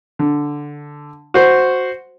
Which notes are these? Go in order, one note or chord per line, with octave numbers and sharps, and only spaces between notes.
D3
F#4 C5